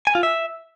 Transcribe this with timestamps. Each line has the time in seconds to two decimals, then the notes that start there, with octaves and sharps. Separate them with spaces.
0.07 G#5
0.15 F4
0.23 E5